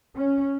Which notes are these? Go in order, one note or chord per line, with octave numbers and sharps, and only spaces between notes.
C#4